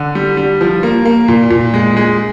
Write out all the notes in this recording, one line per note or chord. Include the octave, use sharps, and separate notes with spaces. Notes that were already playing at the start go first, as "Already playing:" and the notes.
Already playing: D3
G3
G3
F3
A#3
A#3
A#2
A#2
G#3
G#3